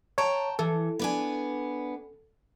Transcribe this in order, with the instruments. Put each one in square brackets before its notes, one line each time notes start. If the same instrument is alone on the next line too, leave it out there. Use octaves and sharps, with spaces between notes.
[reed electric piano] C#5 [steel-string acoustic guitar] G5 A5 A#5
[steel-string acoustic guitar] E3 [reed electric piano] A4
[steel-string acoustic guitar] B3 D4 G#5